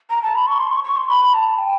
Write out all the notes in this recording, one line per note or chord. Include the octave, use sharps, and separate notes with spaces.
A#5
A5
B5
C#6
C6
C#6
C#6
C6
B5
A5
G5